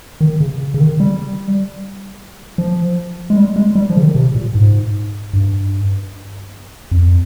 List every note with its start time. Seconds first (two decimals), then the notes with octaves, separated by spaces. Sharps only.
0.21 D#3
0.40 C#3
0.74 C#3
0.80 D#3
1.00 G3
2.58 F3
3.30 G#3
3.37 G3
3.56 G#3
3.75 G3
3.90 F3
3.97 C#3
4.02 D#3
4.15 C3
4.35 A#2
4.55 G#2
5.33 G2
6.91 F2